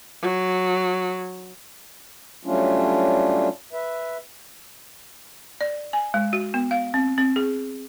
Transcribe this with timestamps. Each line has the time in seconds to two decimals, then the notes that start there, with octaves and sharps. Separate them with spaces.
0.22 F#3
2.45 F#3 G3 A3 C#4 D4 F4
3.73 B4 E5
5.61 D5
5.93 G#5
6.14 G#3
6.33 F#4
6.54 B3
6.71 F5
6.94 C4
7.18 C4
7.36 G#4